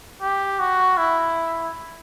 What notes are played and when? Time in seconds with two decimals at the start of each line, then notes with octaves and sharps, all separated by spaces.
0.22 G4
0.60 F#4
0.98 E4